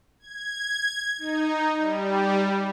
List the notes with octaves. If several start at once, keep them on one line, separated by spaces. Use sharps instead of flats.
G#6
D#4
G3